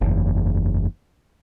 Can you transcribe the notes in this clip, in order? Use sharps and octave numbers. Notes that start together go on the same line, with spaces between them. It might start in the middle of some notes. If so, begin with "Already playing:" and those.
F#1 E2